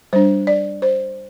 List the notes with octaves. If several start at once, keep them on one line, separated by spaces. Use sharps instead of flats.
G3 D4 C5
D5
C5